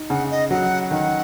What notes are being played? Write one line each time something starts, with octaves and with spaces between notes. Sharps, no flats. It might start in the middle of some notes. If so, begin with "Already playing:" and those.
Already playing: D#4
C#3 F#5
D#5
F#3 F#5
D#3 F#5